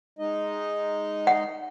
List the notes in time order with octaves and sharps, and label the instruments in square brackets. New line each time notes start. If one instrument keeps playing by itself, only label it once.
[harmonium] G#3 D#4 D#5
[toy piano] F#5